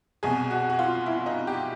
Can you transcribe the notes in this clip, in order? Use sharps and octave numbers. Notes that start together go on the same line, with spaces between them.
C2 B2 G#4
F#4
F#4
F4
E4
D#4
G4